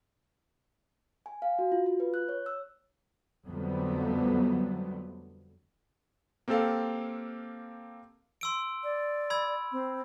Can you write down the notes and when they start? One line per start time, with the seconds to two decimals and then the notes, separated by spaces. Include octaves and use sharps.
1.26 G#5
1.42 F5
1.59 F#4
1.72 F4
1.86 F4
2.00 B4
2.14 F#6
2.29 C#5
2.46 E6
3.46 F2 D3 F#3 G3 A3 B3
6.48 A#3 C4 G4 A4 F5
8.41 C6 E6 D7
8.84 D5
9.30 B5 E6 G#6
9.72 C4